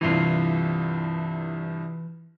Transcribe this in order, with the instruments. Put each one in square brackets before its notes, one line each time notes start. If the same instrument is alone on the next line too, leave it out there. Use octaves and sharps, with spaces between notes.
[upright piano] C2 G2 C3 [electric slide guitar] E3 F4